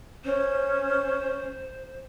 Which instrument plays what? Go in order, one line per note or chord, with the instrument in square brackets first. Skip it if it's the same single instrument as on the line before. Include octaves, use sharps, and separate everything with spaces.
[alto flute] C#4 [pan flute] C5